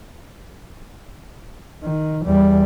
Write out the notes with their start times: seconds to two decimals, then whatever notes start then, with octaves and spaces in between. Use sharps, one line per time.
1.84 D#3
2.26 E2 G3